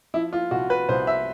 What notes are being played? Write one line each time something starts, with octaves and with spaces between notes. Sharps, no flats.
F3 E4
F4
C2 F#4
B4
C2 C5
E5